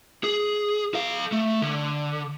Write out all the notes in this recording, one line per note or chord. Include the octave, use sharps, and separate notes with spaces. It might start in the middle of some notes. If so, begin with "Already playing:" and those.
G#4
A4 F5
A3
D3